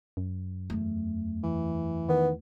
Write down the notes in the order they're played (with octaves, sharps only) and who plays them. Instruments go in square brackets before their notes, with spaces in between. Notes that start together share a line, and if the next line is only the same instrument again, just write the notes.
[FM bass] F#2
[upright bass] E2 A3
[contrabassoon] E3
[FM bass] D#3 [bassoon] B3